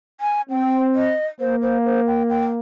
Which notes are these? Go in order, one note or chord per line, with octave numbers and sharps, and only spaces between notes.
G#5
C4 G5
D#5
A#3 C5
C5
C5
G5
G5